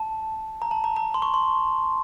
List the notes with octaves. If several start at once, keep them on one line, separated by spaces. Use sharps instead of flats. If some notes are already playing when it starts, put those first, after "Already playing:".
Already playing: A5
A#5
A5
A#5
A#5
C6
C#6
C6